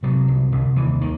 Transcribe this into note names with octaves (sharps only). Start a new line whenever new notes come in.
C3 F#3
C2
C2
D#2 E3
D#3